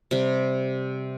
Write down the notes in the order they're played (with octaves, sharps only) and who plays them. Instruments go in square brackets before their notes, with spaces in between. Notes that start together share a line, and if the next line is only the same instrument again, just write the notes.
[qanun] C3 G3